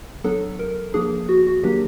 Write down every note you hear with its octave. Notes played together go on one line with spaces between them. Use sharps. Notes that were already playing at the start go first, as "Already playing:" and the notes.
F#3 B3 D4 A4
A#4
F3 A#3 D4 G#4
F#4
F#4
D#3 F#3 A#3 D4 G4